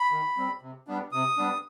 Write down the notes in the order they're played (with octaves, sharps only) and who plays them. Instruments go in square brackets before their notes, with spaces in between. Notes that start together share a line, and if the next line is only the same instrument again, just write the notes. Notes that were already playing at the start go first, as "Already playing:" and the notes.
Already playing: [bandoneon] B5
D#3
G3 C4
C3
G3 B3 D4
C3 D#6
G3 B3 D4